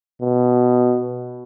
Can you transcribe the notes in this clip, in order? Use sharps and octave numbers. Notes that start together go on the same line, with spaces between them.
B2